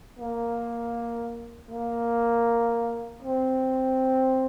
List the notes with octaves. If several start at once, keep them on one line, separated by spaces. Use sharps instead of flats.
A#3
A#3
C4